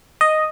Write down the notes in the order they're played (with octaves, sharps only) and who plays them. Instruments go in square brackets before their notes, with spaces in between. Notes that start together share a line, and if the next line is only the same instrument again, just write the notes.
[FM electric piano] D#5